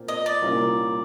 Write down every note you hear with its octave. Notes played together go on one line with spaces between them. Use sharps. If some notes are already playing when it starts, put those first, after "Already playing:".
Already playing: A#2 C4
D#5
D5
C2 A#2 G3 A#3 C#4